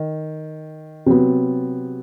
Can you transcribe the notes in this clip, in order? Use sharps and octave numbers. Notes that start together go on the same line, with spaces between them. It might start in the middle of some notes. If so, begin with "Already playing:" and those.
Already playing: D#3
C3 F#3 B3